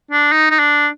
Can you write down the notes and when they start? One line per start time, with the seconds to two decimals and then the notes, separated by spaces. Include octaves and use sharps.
0.11 D4
0.32 D#4
0.51 D#4
0.59 D4